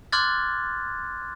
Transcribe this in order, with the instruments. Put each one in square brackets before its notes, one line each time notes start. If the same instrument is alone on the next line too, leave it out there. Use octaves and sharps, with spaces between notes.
[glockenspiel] C6 D6 F6 F#6 G#6 A6